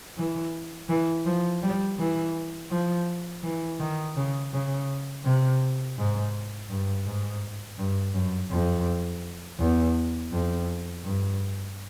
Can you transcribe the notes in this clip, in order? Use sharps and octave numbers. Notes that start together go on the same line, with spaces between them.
E3
E3
F3
G3
E3
F3
E3
D#3
C#3
C#3
C3
G#2
G2
G#2
G2
F#2
F2
E2
F2
G2